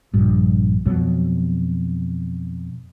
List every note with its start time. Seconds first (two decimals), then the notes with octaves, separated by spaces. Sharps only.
0.14 A#1 G2
0.86 F2 B2 F#3